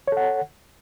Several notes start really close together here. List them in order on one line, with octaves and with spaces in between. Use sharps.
C#5 A4 F#5